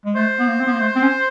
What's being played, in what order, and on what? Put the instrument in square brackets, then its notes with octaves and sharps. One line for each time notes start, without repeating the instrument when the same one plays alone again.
[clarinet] G#3
[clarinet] A3 [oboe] C5
[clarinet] B3
A#3
C4
B3
A#3
A3
C4
C#4